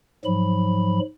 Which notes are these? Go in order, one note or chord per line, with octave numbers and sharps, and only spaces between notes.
G#2 F3 F#3 B5